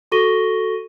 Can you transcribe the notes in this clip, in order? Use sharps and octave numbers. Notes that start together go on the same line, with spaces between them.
F#4 A4 C#6 A#6 D#7 G7